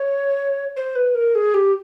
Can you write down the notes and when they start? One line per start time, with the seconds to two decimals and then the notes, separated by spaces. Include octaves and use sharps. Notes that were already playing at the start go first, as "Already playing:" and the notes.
Already playing: C#5
0.77 C5
0.95 B4
1.15 A#4
1.35 G#4
1.54 G4